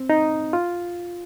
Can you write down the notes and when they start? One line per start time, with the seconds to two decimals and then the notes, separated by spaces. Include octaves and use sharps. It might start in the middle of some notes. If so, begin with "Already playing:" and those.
Already playing: C4
0.10 D#4
0.53 F4